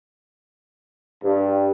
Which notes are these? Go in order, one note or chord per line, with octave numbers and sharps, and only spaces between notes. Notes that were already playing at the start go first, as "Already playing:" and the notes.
G2